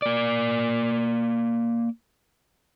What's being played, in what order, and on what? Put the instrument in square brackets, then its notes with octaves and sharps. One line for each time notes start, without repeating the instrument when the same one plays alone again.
[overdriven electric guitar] A#3 D5